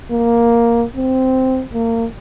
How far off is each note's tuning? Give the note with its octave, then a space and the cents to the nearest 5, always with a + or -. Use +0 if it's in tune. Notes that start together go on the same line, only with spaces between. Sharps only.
A#3 +5
C4 -5
A#3 -30